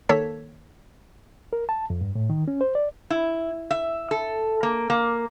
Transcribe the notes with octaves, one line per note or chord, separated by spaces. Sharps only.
D#3 A#3 A4 C#5 A5 B6
A#4
A5
F2
G2
A2
D#3
C#4
C5
D5
E4
E5
A4
A#3
A#3